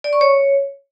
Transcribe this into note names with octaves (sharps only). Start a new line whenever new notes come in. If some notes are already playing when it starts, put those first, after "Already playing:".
D5
C#6
C#5